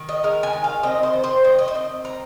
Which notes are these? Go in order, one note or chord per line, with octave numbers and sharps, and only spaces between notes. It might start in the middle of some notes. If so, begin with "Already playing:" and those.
Already playing: D#3
D#5
G#3 A#4
G#5
D#3
F5
C4 D#5
C5
D#3
C5
D#3 D#5
D#5
C5
C4 D#5
A#3 A#5